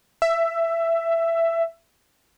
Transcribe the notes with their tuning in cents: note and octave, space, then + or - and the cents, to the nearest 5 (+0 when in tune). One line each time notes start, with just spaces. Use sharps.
E5 +15